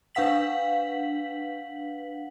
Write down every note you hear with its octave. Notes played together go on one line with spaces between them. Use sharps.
D4 B4 F5 F#5 B6 F#7